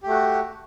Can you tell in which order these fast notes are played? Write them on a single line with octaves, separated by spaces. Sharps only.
G4 A3 F#4